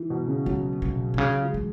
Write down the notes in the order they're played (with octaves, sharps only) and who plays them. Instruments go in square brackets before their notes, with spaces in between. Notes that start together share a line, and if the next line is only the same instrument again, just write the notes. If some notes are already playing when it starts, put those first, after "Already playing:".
Already playing: [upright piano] E3
B2
C#3
[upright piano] F#3 [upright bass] B3
[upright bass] B2
B2
[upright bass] C#3 [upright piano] F#3
[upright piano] G#3
[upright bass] E3